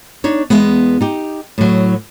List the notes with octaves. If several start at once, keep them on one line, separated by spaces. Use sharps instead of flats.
D4 D#4 C#5
E2 G#3 B3
D#4 G4
A2 F#3